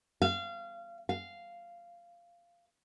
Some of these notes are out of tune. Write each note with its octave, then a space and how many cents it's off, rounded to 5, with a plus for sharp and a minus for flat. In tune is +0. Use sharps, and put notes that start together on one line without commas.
F5 -25
F5 -10